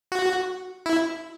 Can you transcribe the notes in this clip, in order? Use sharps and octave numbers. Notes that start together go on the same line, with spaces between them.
F#4
E4